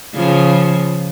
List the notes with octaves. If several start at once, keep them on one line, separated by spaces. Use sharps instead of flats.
C#3 F3